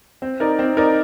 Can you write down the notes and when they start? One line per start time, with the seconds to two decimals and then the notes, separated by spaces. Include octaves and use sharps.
0.22 C4
0.40 D#4 A#4 D5
0.59 C4
0.77 D#4 A#4 D5